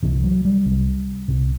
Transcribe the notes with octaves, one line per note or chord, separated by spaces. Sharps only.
C2 C3 E3
F#3
G3
C2 C3
C2 C3